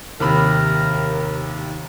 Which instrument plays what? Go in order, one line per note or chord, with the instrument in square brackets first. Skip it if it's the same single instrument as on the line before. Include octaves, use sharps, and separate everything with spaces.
[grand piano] D#2 C3 B5 [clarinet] A#4